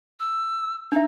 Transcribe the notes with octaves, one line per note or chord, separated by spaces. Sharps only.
E6
D4 D#4 E5